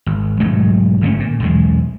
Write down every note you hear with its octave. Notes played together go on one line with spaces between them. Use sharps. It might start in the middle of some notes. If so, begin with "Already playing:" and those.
G#1
B1 G#2 F#3 A3
G#1 D3 A3 C#4
A#2
B1 E2 G#3